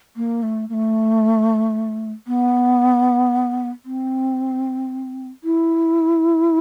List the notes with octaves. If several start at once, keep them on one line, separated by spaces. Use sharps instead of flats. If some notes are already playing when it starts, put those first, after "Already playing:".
A#3
A3
A#3
A3
B3
C4
E4